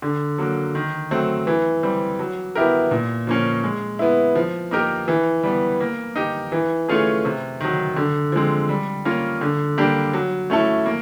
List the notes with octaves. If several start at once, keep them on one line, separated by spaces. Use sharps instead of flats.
D3
F#3 A#3
D#3
F#3 A3 C4
E3
G3 C4
F#3
B3 E4 G4 A#4
A#2
F3 A#3 C#4
G#3
B3 E4
F3
A#3 D#4 G4 A#4
E3
G3 B3
A#3
D#4 G4
E3
A3 C#4 F4 G#4
C3
D#3 F#3
D3
F3 G#3 C4
G3
A#3 C#4 F4
D3
G3 A#3 D4 G4
F#3
A3 C#4 E4 A4
A#3